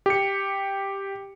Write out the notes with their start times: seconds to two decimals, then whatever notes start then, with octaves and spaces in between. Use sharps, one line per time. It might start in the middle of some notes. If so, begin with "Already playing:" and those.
0.06 G4 C#7